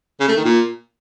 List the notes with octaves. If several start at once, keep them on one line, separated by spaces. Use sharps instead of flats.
C#3
A3
D#3
A#2